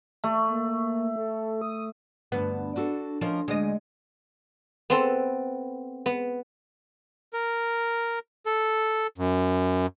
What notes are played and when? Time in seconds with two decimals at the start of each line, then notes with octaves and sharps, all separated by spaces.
0.24 A3
0.49 A#3
1.16 A4
1.61 D#6
2.32 D2 G2 B3 A5
2.76 D4 F#4 A4
3.21 F3 C#4 A#4 D#5
3.48 D2 G#3 D#5
4.90 B3 C4 A4
6.06 B3
7.33 A#4
8.46 A4
9.18 F#2